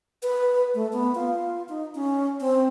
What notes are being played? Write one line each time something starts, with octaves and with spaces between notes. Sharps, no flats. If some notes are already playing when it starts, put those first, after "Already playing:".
B4
A3
B3
F4
D#4
C#4
C4